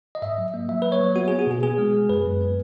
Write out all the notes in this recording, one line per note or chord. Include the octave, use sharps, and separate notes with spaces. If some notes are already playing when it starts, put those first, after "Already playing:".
D#5
G#2 E5
F#3
A#3
F#3 E5
A#3 B4
C#5
F#3
B3 F#4
B3 G#4
F#4
B2 G#4
B3 G#4
G#3
G#3
F#2 B4
F#2
B3